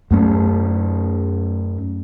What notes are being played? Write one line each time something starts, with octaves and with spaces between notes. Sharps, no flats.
F#2 A3 C#4